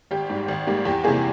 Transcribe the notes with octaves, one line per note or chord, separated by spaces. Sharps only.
G#1 G4
G#2 G3
G#1
G#2 G3 A#3
E2 G4
C3 E3 G3 A#3 G#4